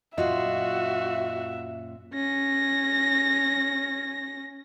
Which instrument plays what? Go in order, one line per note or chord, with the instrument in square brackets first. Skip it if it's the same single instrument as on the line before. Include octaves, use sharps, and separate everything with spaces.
[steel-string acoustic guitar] F#2 A#2 F4 [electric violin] F#4 [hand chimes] D#5 [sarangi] E5
[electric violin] C#4 A#6